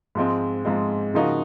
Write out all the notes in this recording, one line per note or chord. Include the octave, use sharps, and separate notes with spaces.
G#2 F3 G#3 C4
G#2 F3 G#3 C4
C#3 F3 A#3 D#4 F#4